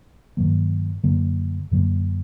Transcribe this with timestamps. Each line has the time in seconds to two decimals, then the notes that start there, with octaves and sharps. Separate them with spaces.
0.37 G2 D#3 F#3 A#3
1.04 F#2 D3 F#3 A#3
1.71 F#2 D3 F#3 A#3